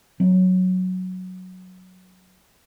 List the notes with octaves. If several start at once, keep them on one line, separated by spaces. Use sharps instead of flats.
F#3 C4